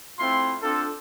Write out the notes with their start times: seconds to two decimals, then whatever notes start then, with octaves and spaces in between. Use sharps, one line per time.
0.20 A3 C4 E4 F4 C6
0.62 C4 D4 F4 A4